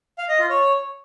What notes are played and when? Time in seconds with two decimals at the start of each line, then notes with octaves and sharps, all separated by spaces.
0.18 F5
0.29 D#5
0.39 F4
0.50 C#5